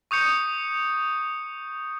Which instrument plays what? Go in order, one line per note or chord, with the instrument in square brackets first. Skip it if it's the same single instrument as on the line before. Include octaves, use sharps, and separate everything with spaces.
[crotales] C#6 D#6 G6 C#7